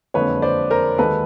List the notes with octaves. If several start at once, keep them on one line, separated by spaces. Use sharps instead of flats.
F#1 F2 D3 F3 G#3 B4 C#5
C5 D5
A#4 C5
D#2 D#3 G#3 A4 B4